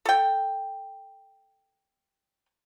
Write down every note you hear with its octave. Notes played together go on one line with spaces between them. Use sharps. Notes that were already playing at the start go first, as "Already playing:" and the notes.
A4 G5